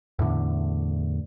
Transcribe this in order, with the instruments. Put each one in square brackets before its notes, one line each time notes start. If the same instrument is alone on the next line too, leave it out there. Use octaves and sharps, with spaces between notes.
[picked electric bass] E2 A2 D3